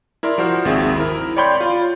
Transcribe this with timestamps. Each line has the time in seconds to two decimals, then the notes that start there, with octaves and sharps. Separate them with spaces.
0.23 E4 A#4 D5 C6
0.38 F3 F#4 C5 F6
0.65 G#1 D#2 C4 G#4 E5
0.96 E4 A#4
1.37 C#5 D5 G5 B5 C6 G6
1.61 F4